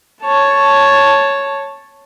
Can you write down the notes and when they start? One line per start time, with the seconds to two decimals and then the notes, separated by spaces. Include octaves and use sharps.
0.21 C#5 A5